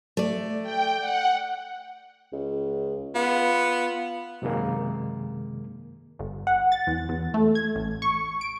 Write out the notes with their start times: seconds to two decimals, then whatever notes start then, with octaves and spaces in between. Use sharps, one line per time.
0.17 A3 D5
0.63 G5
1.00 F#5
2.32 C#2
3.15 B3 F4
4.42 F#2 C3 D#3 G#3 A#3
6.19 G1
6.47 F#5
6.72 A6
6.87 E2
7.09 E2
7.34 A3
7.55 G#6
7.75 A1
8.02 C#6
8.41 D7